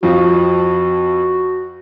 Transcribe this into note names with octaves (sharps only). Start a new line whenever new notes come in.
F2 F3 F#4 F5